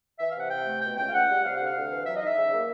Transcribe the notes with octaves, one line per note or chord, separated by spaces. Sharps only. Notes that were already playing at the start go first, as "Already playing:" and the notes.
E3 E5
C3 F5
F#5
C3 G5
A3
B2 G5
C#2 G5
F5
C#2 F#5
G3
C3 F5
D2 F#5
F5
D2
E3
F#3 E5
D#4 D#5
E5
C#3
A#3